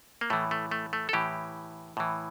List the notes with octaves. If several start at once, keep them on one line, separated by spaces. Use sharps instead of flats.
A#3
A2 E3 A3
A3
A3
A3
A4
A2 E3 G4
A2 E3